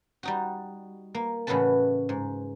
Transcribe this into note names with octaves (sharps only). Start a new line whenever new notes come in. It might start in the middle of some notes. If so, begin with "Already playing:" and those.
G3 D#4 F#4
A#3
A2 C#3 E3 F#4 B4 A5
G#2